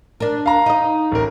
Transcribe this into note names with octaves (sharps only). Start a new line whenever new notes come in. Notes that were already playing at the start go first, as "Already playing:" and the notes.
D4 A#4
F5 A#5
D#4 D#5
A1 A#4